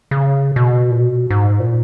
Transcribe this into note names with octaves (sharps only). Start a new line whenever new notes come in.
C#3
B2
A#2
B2
G#2
A#2